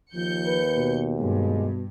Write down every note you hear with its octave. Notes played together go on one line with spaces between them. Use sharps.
D#2 F3 G6 C#7
B4
B2
G2 B2 G#3